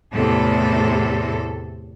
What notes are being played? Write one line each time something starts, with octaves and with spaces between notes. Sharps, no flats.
E2 A2 C3 A4